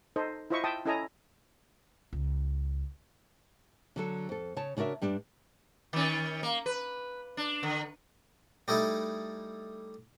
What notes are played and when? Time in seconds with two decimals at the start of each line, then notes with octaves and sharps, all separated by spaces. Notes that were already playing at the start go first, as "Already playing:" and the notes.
0.16 D#4 A4 C5 D#5
0.50 E4 F4 C5 D#5 E5 C#6
0.64 E5 G5 A5 D#6
0.85 C#4 E4 A4 D#5 G#5 A#5
2.13 C#2
3.96 D3 F#3 A4
4.29 F2 A4
4.56 C#3 C#5 A5
4.77 C#3 D4 F#4 A#4 E5
5.02 G2 G3 D4
5.93 D#3 C#4
6.43 A#3
6.66 B4
7.37 D4
7.63 D3
8.68 G3 A3 D#4 E4